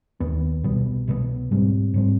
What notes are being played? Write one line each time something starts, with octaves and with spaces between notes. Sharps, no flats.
D#2 D#3 B3
C2 B2 G3 B3
C2 B2 G3 B3
G#2 G3 C4
G#2 G3 C4